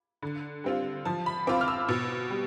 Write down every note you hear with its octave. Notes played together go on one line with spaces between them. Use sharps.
D3
G3 C4 F4
F3 A5
B5
C4 F4 D6
F6
E6
B2
G3